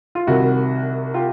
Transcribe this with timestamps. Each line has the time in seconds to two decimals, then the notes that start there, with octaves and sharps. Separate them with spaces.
0.15 F4
0.27 C2 C3 D#3 E4 F#4
1.14 F4 G4